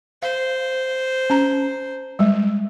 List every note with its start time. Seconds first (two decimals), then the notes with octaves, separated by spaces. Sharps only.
0.23 C5 F5
1.30 C#4 A#5
2.19 G3 G#3